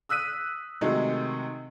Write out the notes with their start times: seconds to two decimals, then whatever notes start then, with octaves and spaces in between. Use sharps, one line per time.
0.09 D#6 E6 F#6 B6 D#7
0.81 C3 D#3 F#3 G#3 A3